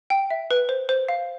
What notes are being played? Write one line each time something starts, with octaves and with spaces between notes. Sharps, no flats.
G5
E5
B4
C5
C5
F5